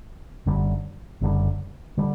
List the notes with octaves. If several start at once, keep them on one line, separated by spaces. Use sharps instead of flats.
F#1 F#2 D3 G3
F#1 F#2 D3 G3
D3 G3